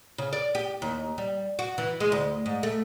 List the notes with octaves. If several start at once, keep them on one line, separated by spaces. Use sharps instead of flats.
C#3
D5
G4
D#2
G3
F#4
E3
G#3
D2
G#2
A3